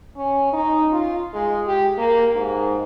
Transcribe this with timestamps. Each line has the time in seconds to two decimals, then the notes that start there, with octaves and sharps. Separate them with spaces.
0.17 C#4
0.53 D#4
0.92 F4
1.33 G#3
1.67 G4
1.98 A#3
2.35 G#2